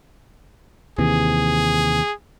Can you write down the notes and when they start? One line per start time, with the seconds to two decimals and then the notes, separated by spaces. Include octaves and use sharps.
0.98 D#2 C3 E3 G#4